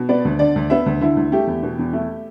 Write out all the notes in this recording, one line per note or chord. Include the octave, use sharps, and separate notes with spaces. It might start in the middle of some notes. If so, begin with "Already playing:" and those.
Already playing: B2
B3 D5
D2
D3 D5
D2
B3 E5
D2
D3 E4
D2
A3 G4
E2
B2
E2
A3